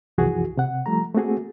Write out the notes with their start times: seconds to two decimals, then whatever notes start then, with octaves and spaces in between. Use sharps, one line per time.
0.18 C2 F#2 E3 F3 F#4 G#4
0.57 C3 F#5
0.86 F3 G3 A3 A#5
1.15 A3 A#3 C4 F#4 G#4